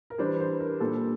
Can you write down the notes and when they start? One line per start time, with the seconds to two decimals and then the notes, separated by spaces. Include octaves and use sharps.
0.10 A#4
0.18 E3 G3 D4 C5
0.40 C5
0.60 A#4
0.80 A#2 G3 D4 A4